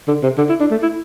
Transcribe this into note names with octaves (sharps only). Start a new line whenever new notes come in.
D3
C3
D3
E4
D4
A3
E4